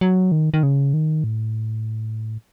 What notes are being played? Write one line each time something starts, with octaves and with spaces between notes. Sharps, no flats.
F#3
D#3
D#3
C#3
D#3
A2